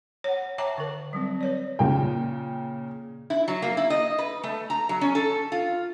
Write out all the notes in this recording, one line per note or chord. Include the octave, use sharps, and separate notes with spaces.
C#5 F#5
C#5 E5 G5 A5 A#5 D6
D3 A#4
F#3 G3 C4
B4 C#5 D5
A#2 C#3 G5
E4
F#3
A#3
E4
D#5
B4
A3
A#5
F#3
C#4
A4
F4